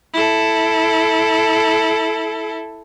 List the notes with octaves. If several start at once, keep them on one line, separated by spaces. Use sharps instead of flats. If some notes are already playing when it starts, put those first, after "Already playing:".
E4 A4